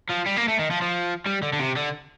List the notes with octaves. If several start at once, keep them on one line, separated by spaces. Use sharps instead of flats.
F3
G3
A#3
A3
D#3
F3
F3
G3
D3
D3
C3
D3